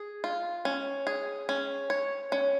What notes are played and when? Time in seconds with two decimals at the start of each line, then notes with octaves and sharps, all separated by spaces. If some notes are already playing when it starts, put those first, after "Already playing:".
Already playing: G#4
0.24 F4
0.65 C#4
1.07 G#4
1.49 C#4
1.90 C#5
2.32 C#4